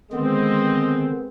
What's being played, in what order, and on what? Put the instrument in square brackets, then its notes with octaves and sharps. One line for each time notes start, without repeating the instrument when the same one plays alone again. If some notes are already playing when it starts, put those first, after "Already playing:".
[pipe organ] D3 D#3 [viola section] G#3 C4 [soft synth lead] B3 [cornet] D#5